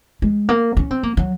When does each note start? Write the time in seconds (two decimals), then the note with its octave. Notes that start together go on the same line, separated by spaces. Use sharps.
0.22 G#3
0.49 A#3
0.77 C#4
0.91 C4
1.03 A#3
1.17 F#3